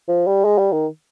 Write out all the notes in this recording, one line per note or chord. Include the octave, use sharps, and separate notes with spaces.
F3
G3
G#3
G3
D#3